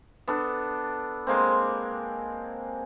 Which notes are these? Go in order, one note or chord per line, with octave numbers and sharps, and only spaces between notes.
B3 D4 A4
G#3 A#3 C4